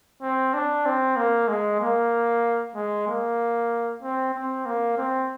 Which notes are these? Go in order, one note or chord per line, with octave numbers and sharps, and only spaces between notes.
C4
D4
C4
A#3
G#3
A#3
G#3
A#3
C4
C4
A#3
C4